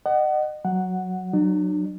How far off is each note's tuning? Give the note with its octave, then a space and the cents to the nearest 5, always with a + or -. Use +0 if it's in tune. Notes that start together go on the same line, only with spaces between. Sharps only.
D#5 -35 F#5 +25
F#3 +0 F#5 +0
F#3 +0 D4 +45